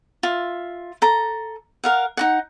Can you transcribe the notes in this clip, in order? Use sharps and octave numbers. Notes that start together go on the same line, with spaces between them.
F4 E5
A4 A#5
A#4 F5 F#5
D#4 F#4 F#5